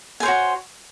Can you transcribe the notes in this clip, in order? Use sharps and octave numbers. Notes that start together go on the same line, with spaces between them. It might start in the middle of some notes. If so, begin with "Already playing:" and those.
F#4 C5 C#5 G#5